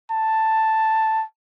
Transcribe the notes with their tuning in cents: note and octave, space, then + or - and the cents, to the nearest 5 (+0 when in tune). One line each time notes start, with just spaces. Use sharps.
A5 +5